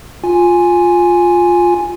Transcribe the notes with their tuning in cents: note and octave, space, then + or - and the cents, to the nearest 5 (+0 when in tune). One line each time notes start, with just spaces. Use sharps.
F4 +10 G#5 +0